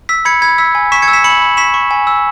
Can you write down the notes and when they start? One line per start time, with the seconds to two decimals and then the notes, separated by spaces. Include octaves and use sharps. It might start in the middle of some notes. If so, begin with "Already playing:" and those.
0.09 E6 B6
0.25 B5 G#6 C#7
0.42 B5 G#6
0.58 E6 B6
0.75 G#5
0.92 C#6 B6 E7
1.02 G#6 C#7
1.08 E6
1.13 B6 E7
1.24 B5 C#7 F#7
1.41 B5
1.57 C#6 B6 E7
1.74 C#6
1.91 G#5
2.07 E6